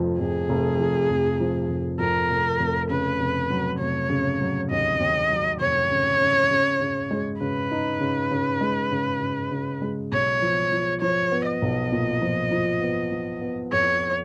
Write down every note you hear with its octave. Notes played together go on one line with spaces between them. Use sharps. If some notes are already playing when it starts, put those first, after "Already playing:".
Already playing: F1 F2 F3
F2 G#4
F1
F3
F1
F3
F1
F2 A#4
F1
F1
C#3 B4
F1
F#3
F1 C#5
C#3
F#3
D#2 D#5
D#2
F#3
F1 C#5
C#3
C#3
C#3
C#3
G#3
C#3 B4
D#4
C#3
C#3
G#3
C#3
C#3
C#3
G#3
B1 C#5
F3
F3
F3 C#5
B3
D#5
B1
A#2
F3
F3
B3
F3
B3
F2 C#5